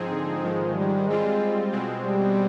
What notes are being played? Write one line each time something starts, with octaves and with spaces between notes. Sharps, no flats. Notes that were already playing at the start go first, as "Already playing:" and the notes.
Already playing: G#2 F3 C4 D#4 G#4
D3
G#2 D#3 F3 G#3
G3
G3 G#3 C4 F4
B2 G#3 C4
G3